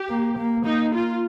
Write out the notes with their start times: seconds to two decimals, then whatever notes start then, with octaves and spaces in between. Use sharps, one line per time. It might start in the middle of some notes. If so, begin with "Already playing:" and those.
Already playing: G4
0.09 A#3
0.38 A#3
0.65 A#3 D#4
0.94 F4